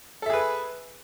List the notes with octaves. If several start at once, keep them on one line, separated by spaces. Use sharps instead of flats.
G#4 A4 B4 E5